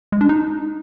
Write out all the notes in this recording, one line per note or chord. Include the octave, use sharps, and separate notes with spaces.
G#3
D4
D#4